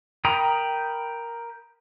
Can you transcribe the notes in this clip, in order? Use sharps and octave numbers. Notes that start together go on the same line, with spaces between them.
A#4 G5 A#5 B5 D#6